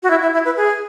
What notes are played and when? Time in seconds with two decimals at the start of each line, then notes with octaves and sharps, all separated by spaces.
0.03 F#4
0.10 E4
0.22 E4
0.33 E4
0.45 B4
0.57 G#4